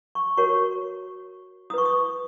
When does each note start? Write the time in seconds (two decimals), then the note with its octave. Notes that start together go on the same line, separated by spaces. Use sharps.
0.15 C#6
0.37 F#4 A#4 C#5 C#6
1.70 E4 D#6
1.74 B4 C#6
1.86 D#6